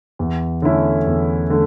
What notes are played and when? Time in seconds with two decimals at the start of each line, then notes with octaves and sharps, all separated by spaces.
0.19 E2
0.62 D3 A3 C#4 E4
1.07 E2
1.50 D3 A3